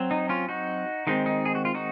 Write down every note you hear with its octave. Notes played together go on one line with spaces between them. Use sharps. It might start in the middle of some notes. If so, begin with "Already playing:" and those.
Already playing: F#3 C4
D#4
C#4 F4
D#4 F#4
D#3 G#3 C4 D#4
D#4
G#4
F#4
F4
D#4 F#4